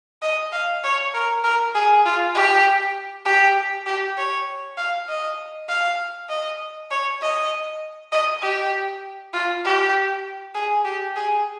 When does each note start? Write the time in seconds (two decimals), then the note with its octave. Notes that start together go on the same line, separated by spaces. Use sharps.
0.22 D#5
0.52 F5
0.84 C#5
1.14 A#4
1.44 A#4
1.75 G#4
2.05 F4
2.35 G4
3.25 G4
3.86 G4
4.17 C#5
4.77 F5
5.08 D#5
5.69 F5
6.29 D#5
6.91 C#5
7.21 D#5
8.12 D#5
8.42 G4
9.33 F4
9.64 G4
10.54 G#4
10.84 G4
11.16 G#4